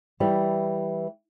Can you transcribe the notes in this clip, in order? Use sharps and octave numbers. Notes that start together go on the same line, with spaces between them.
E3 G3